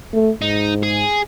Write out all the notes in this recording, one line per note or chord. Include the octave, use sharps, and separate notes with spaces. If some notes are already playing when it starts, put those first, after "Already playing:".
A3
G#2 D#4
G#4